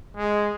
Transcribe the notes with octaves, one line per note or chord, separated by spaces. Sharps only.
G#3